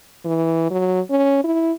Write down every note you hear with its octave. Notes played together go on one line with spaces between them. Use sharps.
E3
F#3
C#4
E4